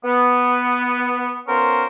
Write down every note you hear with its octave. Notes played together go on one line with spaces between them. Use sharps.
B3
B3 C#4 F4 A#4 C5